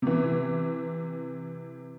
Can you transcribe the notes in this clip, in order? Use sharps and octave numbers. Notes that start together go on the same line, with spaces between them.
C3 E3